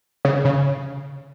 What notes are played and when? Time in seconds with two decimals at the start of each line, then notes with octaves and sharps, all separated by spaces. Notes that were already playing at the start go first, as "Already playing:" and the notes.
0.25 C#3
0.45 C#3